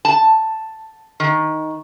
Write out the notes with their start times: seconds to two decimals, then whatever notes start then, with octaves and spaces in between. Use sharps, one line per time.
0.05 A5
1.20 D#3